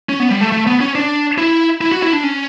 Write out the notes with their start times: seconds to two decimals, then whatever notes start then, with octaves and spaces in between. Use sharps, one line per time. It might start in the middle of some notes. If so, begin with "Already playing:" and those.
0.09 C#4
0.20 B3
0.31 G3
0.41 A3
0.52 A3
0.67 B3
0.81 C#4
0.95 D4
1.38 E4
1.81 E4
1.92 F#4
2.02 E4
2.13 D4
2.24 C#4